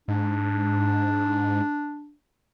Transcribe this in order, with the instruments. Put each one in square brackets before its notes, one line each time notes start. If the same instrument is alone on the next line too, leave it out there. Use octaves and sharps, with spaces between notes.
[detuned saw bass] G#2 [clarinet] D4